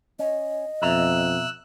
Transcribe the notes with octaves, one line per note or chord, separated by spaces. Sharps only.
C#4 D#5
F2 B2 E5 A#5 E6 F#6